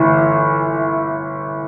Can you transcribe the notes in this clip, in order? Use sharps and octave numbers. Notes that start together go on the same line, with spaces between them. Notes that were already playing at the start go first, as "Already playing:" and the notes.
Already playing: G1 E3